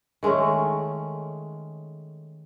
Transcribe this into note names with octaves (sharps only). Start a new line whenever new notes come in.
D#3 G#3 A3 C#4